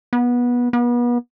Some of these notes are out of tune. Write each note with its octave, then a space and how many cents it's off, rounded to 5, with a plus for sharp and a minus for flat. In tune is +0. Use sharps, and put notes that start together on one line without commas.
B3 -20
B3 -35